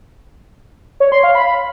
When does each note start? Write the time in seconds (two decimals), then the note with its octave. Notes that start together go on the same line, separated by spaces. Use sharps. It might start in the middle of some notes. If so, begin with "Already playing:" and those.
1.00 C#5
1.12 C6
1.23 F5
1.35 B5